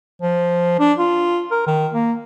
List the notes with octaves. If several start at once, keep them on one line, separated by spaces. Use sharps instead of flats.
F3
D4
F4
A#4
D#3
A#3